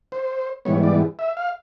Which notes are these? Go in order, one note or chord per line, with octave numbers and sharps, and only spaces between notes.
C5
G#2 E3 G3 B3 C#5
D5
E5
F5